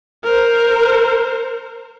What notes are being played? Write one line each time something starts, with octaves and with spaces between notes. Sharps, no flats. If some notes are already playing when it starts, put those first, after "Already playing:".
A#4 C5